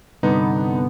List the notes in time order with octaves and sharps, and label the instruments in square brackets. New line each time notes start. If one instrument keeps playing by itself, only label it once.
[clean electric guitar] C2 G2 D3 [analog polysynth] B3 [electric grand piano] D#4